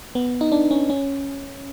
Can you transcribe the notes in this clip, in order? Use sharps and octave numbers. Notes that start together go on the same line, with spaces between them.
B3
D#4
D4
C#4
C#4